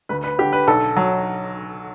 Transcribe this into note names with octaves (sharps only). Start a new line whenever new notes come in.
D2 B4
B4
D3 G4
B4
B1 A4
F#3